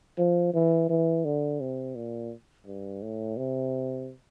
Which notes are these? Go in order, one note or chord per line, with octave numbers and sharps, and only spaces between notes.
F3
E3
E3
D3
C3
A#2
G2
A2
C3